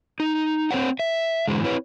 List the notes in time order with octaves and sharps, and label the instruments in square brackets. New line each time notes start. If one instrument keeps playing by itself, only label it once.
[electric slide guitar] D#4
C4 C5 C#5 F#5
E5
G#2 D3 E3 G#3
C4 E4 B4 C#5